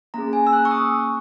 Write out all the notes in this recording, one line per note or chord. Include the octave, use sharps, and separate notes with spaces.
A#3 C#4 G#4 A#5
G#5
E6
F#6
C#6
D#6